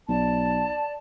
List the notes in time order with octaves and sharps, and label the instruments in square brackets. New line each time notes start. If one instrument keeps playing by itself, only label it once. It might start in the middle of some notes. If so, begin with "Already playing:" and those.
[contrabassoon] B1 [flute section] D5 A5